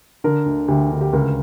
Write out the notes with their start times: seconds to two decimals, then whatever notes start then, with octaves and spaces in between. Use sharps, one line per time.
0.24 D3 A#4
0.46 D2
0.68 D2 G4
0.91 D2
1.01 G4
1.13 C#2 A#4